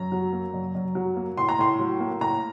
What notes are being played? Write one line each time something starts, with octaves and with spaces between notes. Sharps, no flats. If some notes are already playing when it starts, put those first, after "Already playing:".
Already playing: F#2 A#5
F#3
A#3
F#2
F#2
F#3
A#3
A2 C6
A#5
A2 C6
F#3
A#3
A2 A#5